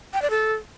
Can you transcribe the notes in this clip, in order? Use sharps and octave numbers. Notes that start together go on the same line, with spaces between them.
G5
D5
A4